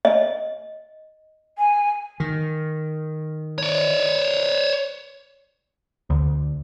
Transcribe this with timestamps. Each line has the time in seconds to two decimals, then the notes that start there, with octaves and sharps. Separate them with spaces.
0.05 D#5
1.58 G#5
2.20 D#3
3.58 C#5 D5
6.10 D2